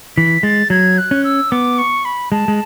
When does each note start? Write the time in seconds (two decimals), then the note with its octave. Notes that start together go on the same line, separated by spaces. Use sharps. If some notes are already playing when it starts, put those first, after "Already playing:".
0.17 E3 B6
0.43 G#3 A6
0.70 F#3 G#6
0.98 F#6
1.11 C#4
1.24 E6
1.51 B3 D6
1.78 C#6
2.05 B5
2.32 G#3 A5
2.48 G#3